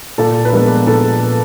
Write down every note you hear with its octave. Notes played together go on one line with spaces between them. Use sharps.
A#2 A4
B4
F3 G#3 B3 D4 A#4
A#2 A4